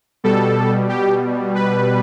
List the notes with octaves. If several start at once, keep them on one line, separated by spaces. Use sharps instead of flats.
B2 G3 A4
G4
B4